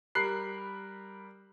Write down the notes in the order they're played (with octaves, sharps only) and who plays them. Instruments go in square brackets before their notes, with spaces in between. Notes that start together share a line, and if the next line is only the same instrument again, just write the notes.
[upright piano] G3 A#4 B5 F#6 C7